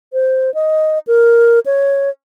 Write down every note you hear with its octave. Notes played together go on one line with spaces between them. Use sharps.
C5
D#5
A#4
C#5